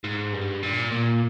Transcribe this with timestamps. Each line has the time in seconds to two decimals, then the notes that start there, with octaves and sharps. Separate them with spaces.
0.04 G#2
0.33 G2
0.63 A#2
0.92 A#2